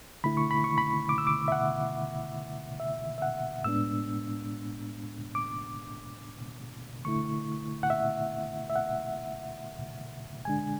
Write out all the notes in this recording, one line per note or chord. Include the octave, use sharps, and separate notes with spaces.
D3 A3 E4 B5
C#6
B5
C#6
B5
D6
E6
D6
E5
F#5
E5
E5
F#5
A2 G#3 B3 D4 E6
D6
D3 A3 E4 C#6
F#5
E5
E5
F#5
D3 G#3 D4 G#5